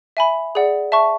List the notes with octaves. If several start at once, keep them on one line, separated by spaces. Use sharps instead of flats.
E5 G#5 B5
G#4 D5 F#5
E5 A5 C#6